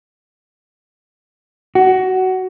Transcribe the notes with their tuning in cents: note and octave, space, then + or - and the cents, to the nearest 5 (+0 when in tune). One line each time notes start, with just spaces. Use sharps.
F#4 +15